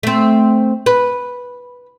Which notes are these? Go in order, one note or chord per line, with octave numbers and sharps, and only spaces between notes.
A3 C4
B4